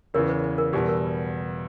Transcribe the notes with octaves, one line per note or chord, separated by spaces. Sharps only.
E2 C#3 E3 A#4 C#5
B4
B4
A#4
E2 B2 G3 G4
A#4